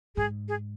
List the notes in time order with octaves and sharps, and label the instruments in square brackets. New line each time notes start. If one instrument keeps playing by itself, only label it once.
[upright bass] G#2 [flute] G#4
[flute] G#4